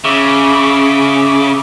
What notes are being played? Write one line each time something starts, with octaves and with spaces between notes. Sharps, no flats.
C#3 E5 D6